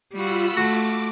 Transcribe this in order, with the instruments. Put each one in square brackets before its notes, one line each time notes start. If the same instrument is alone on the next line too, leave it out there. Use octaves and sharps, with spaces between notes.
[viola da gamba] G3 F#4 [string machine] F4 B5 E6
[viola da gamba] A3 [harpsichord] F#4 [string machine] D6